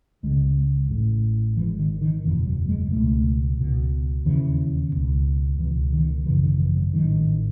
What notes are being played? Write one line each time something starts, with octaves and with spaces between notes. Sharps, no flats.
C#2 C#3 G#3
A1 A2
G#1 G#2 E3
D#3
D#3
F#1 E2 B2 E3
F#3
G#3
C#2 B2 A3
C#2 B2
E1 D#2 C#3 E3
C#2 B2
C#2 B2 E3
D#3
G#1 F#2 C#3 E3
D#3
E3
F#3
A1 G#2 D#3